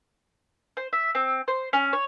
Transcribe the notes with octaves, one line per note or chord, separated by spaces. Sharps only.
C5
E5
C4
C5
C#4
C#5